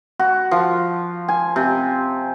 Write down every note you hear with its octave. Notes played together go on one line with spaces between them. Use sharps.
F#4
F3
G#5
C3